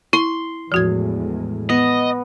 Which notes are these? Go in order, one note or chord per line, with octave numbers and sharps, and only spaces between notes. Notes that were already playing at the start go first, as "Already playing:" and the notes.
E4 C6
E2 A2 F3 G#3 F#4 G#6
B3 D#5